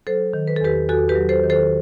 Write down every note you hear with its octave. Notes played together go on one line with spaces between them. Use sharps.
F#3 A4 C5
D#3
B4
A4
E2 G4 B4
E2 F#4 A4
G4 B4
F#3
A4 C5
D#3
A4 C5